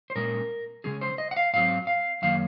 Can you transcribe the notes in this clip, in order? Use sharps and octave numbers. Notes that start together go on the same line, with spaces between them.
C5
A#2 G#3 C#4 A#4
C#3 G#3 C#4 G#4
C5
D#5
F#5
F5
G#2 F#3 C4 F5
F5
F#2 D#3 A#3 C#4 F5